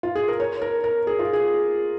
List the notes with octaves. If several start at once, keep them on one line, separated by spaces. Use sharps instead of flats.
F4
G#4
A#4
C#5
A#4
A#4
G#4
F4
G#4